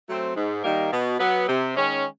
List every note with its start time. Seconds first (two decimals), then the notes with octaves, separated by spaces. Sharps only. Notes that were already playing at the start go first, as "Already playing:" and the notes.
0.08 F#3 A3 C4
0.36 G#2
0.64 D#3 G3 A#3 D#4
0.92 B2
1.20 F#3 B3
1.49 C3
1.77 D#3 G#3 C#4